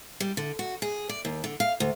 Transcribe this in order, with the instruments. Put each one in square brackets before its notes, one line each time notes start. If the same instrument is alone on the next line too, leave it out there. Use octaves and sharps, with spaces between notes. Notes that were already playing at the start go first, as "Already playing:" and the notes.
[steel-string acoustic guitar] G3
D3
F#4
G#4
D5
D#2
D3
F5
D2